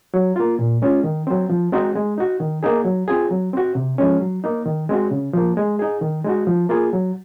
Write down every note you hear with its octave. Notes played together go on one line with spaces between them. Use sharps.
F#3
A#3 F4
A#2
G#3 C#4 F4
D#3
F#3 C4
F3
G#3 C4 D#4 F#4
G#3
D#4 F#4
D#3
A#3 D#4 G#4
F#3
C4 F4 G#4
F#3
C4 F#4
C3
F3 G#3 C#4
F#3
A#3 D#4
D#3
G#3 C4 F#4
C#3
F3 A#3
G#3
D#4 G#4
D#3
G#3 D#4 F#4
F3
A#3 F4 G#4
F#3